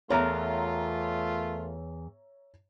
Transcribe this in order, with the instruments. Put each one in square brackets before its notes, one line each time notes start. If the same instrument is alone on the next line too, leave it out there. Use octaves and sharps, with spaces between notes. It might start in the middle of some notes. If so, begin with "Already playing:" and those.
[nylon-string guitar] E2 B3 [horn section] A3 F4 [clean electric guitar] A#4 [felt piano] C#5 E5 A#5